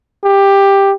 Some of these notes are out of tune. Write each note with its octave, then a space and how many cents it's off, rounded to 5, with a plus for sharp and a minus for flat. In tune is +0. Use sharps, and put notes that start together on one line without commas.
G4 +10